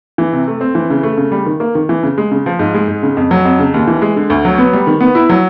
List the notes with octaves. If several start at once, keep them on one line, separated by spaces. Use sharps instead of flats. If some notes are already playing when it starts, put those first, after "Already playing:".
E3
C3
A3
C4
E3
C#3
A3
C#3
G3
D#3
A#3
D#3
E3
C#3
G#3
C#3
F3
G#2
G#3
G#2
C#3
F2
F#3
F2
C#3
D#2
E3
G#3
D3
D2
F#3
B3
G3
D#3
B3
E4
F#3